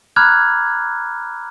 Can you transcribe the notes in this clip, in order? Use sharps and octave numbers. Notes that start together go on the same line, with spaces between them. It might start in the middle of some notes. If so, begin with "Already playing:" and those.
A#5 B5 D6 F6 F#6 G#6